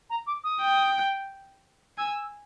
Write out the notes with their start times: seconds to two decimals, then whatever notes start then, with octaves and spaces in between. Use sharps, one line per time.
0.10 A#5
0.26 D6
0.44 D#6
0.61 G5
1.98 G#5 E6